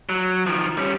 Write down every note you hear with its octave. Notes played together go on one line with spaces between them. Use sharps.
F#3
D#3 F3
G3 C#4